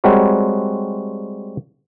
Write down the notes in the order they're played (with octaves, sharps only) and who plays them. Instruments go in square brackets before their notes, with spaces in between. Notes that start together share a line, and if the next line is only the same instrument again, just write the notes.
[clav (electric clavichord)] G3 G#3 C4 F#4 A#4 C#5